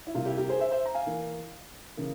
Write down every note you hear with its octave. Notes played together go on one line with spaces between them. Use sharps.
E4
C3 G3 A#3 F4
E4 G4
G4 A#4
G#4 C5
C5 E5
C5 E5
A#5
F5 G#5
E3 A#3
C#3 E3 A#3